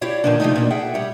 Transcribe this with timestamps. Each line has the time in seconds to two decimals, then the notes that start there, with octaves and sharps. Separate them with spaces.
0.01 E4 G4 C#5 D5 F5
0.24 A#2 D3 D#3 F3 D4
0.40 C3 F3 F#3 A3 D4 D#4
0.56 A#2 D4
0.70 G#4 E5 F#5 G5
0.94 G3 C#5